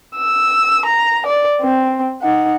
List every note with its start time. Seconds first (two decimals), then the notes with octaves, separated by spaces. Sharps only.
0.17 E6
0.85 A#5
1.26 D5
1.61 C4
2.22 D#4 F#5